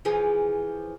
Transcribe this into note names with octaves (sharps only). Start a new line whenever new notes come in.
E3 F3 G#4